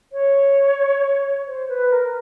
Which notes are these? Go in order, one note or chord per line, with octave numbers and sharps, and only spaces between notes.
C#5
C5
B4
A#4